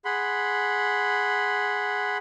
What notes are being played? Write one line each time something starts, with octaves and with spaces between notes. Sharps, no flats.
G#4 F#5 B5 C6